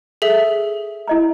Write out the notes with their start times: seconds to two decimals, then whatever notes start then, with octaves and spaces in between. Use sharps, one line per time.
0.22 G#4 A4 E5
1.08 E4 D#5 A#5